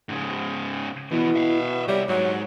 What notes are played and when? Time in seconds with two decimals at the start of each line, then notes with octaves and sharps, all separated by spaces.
0.09 G#2 C#3
1.11 B2 E3 B3 E4
1.36 E5 F5
1.88 C2 G3 C#5 E5
2.09 G#2 F#3